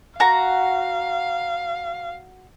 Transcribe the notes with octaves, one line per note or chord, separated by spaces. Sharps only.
F#4 F5 A#5